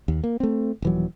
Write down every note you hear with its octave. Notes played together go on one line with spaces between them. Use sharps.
D#2
A#3
A3 C4
D#1 E3 F#3